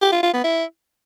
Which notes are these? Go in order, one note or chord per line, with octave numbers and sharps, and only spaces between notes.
G4
F4
F4
B3
E4